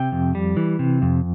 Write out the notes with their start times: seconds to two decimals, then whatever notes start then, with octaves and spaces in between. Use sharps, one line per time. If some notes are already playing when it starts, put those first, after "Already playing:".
Already playing: C3 G5
0.12 F2
0.35 G3
0.57 E3
0.79 C3
1.02 F2